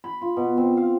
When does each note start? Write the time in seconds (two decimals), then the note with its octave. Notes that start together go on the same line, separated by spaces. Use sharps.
0.04 B5
0.22 F4
0.37 B2
0.58 C4
0.77 F5